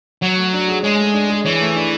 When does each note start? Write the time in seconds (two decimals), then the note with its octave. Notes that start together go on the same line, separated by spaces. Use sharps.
0.22 F#3 C#5
0.37 A3
0.53 D4
0.68 G#4
0.83 G#3 C#5
0.98 A3
1.14 D4
1.30 G#4
1.45 E3 C#5
1.61 A3
1.76 D4